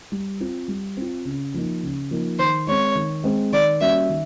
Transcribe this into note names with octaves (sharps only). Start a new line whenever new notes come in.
G3
C4 F4
G3
C4 F4
C#3
F3 A#3 D#4
C#3
F3 A#3 D#4
D#3 C5
G#3 C4 C#5
D#3
G#3 C4
D#3 D5
G3 A#3 C#4 F#4 E5
D#3